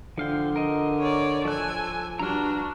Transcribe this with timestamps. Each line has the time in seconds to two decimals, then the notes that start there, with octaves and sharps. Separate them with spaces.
0.18 D3 F3 F5 G5
0.56 A#4 D#5
0.99 C#5 D5
1.45 F3 A4 G#5 F#6
2.19 G2 D4 F#4 A#5 F6